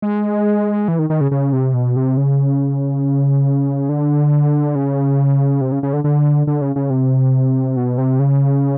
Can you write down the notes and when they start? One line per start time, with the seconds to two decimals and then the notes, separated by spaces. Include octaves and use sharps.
0.02 G#3
0.88 E3
0.99 D#3
1.10 D#3
1.21 C#3
1.31 C#3
1.53 C3
1.74 B2
1.96 C3
2.17 C#3
3.89 D3
4.75 C#3
5.61 C3
5.72 C#3
5.83 C#3
5.93 D3
6.04 D3
6.47 D3
6.61 C#3
6.76 C#3
6.90 C3
7.76 B2
7.98 C3
8.19 C#3